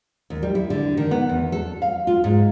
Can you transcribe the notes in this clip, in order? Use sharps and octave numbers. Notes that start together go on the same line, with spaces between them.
D#2
G3
E4
D3
D#3
B3
E2
A4
F5
F4
G#2